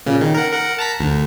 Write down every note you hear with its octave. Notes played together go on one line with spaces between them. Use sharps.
A#2 C#3
D#3
A#4 F#5
A#4 F#5
A5 A#5 B6
D2